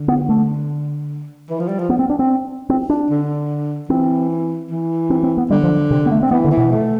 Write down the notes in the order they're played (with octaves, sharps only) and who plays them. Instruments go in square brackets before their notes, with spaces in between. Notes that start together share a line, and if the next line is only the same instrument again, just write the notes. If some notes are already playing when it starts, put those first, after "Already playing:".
Already playing: [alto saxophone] D3
[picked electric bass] B3
A3
[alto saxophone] E3
F3
G3
F3
[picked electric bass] B3
C4
D4
C4
C4
D4
[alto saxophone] D3
[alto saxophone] E3 [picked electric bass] C4
[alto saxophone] E3
[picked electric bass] C4
C4
B3
[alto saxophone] D3 [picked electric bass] G3
[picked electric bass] F3
C3
B3
A3
C4
[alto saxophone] E3 [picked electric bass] B3
[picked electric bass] D3
[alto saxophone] E3
[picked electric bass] B2
[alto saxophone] A3